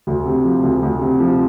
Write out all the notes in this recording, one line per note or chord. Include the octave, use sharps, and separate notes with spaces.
D2
C3
F3
D2
D2
C3
F3